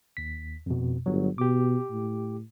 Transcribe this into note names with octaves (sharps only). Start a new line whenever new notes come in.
D#2 B6
F2 B2
G1 F#3
B2 G4 D6
A2